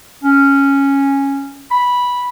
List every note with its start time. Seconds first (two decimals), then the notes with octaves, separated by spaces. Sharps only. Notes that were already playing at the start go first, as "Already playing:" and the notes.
0.24 C#4
1.71 B5